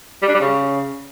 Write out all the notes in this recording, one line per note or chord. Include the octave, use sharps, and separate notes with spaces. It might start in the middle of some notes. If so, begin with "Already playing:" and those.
G3
D4
G3
C#3